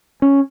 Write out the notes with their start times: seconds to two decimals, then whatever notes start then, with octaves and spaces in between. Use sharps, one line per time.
0.22 C#4